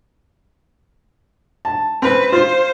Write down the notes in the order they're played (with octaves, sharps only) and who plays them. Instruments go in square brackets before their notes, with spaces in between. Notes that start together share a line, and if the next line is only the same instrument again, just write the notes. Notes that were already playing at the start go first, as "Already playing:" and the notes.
[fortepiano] A5
[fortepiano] C4 [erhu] B4
[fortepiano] F4 [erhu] C5